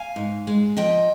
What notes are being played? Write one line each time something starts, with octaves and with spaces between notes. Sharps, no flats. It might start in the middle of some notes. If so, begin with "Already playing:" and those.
Already playing: F5 G#5
G#2
G#3
F3 D#5 G5